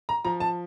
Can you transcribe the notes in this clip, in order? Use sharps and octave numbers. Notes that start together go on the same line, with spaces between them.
A#5
F3 A#5
A5